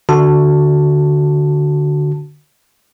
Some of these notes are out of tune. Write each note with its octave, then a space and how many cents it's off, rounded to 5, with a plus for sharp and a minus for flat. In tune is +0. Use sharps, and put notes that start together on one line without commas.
D3 +0 F#4 +0 A5 +5